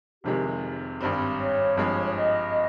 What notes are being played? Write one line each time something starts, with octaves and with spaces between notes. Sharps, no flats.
F1 F2 C3 D#3 G#3 G4
G#1 G2 G3 C4
C#5
G#1 G2 F3 G#3
C#5
D#5